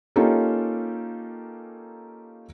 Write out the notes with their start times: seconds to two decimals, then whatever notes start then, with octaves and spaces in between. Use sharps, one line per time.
0.16 A#3 C#4 D#4 F4 G4 A4